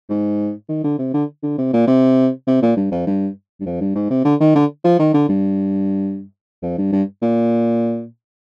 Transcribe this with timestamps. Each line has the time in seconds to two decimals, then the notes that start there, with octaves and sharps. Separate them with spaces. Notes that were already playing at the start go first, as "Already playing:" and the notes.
0.10 G#2
0.69 D#3
0.84 D3
0.99 C3
1.14 D3
1.43 D3
1.58 C3
1.73 A#2
1.87 C3
2.47 C3
2.62 A#2
2.76 G2
2.92 F2
3.07 G2
3.60 G2
3.66 F2
3.81 G2
3.96 G#2
4.10 C3
4.25 D3
4.40 D#3
4.55 D3
4.85 F3
4.99 D#3
5.14 D3
5.29 G2
6.63 F2
6.78 G2
6.92 G2
7.22 A#2